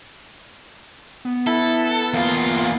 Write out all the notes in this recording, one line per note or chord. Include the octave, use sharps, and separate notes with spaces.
B3
E4 A4
E2 A#3 F4